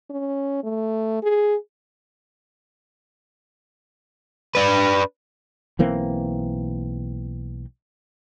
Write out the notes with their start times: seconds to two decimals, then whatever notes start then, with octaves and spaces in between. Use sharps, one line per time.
0.10 C#4
0.63 A3
1.23 G#4
4.55 D4 B4
5.79 B1 E3 A#3 C4